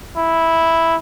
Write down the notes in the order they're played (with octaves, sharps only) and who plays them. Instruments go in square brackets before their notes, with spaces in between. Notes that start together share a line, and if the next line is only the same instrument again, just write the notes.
[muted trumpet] E4